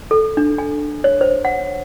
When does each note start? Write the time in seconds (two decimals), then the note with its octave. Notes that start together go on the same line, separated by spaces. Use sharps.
0.11 A4
0.37 D4
0.58 G#5
1.04 C#5
1.21 C5
1.45 F#5